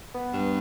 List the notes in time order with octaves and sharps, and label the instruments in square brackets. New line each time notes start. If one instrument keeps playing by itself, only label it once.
[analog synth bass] B3
[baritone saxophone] G2